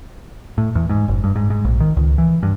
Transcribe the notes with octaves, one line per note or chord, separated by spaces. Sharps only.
A2
E2
G#2
F#1
G2
G#2
G#2
A#1
D#3
C#2
E3
G2